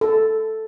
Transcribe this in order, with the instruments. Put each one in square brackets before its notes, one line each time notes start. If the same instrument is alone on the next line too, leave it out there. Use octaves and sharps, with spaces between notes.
[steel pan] A4